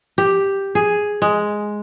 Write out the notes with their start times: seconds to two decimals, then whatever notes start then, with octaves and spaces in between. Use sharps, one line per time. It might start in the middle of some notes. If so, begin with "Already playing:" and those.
0.18 G4
0.75 G#4
1.22 G#3